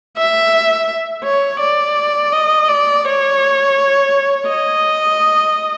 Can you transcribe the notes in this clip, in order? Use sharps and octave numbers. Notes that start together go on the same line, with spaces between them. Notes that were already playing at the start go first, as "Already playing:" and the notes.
E5
C#5
D5
D#5
D5
C#5
D#5